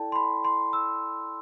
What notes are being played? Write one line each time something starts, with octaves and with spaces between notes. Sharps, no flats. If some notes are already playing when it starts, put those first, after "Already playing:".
Already playing: E4 A4 D5 G5 A5
C6
B5
C6
E6